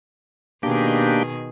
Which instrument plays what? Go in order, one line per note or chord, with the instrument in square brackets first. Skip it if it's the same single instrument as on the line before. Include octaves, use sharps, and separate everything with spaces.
[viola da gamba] B2 D#3 G#4 [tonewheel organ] A#3 D4 G4